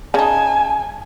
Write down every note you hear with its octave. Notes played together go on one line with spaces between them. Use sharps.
C#3 D#4 G#5 A5